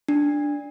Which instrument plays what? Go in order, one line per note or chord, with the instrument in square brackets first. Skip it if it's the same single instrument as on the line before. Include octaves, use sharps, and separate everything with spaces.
[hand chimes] D4